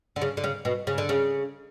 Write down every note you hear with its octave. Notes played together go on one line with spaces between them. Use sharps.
D3
C#3
D3
C#3
B2
C#3
D3
C#3